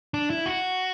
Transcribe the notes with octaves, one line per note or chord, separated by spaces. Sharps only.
D4
E4
F#4